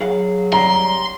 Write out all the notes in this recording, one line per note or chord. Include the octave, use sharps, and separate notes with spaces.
F#3 G#4 F5 F#5
G3 A#5 C6